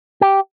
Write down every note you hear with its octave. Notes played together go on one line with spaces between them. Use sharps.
G4